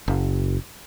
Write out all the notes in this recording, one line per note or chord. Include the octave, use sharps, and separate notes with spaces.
F#1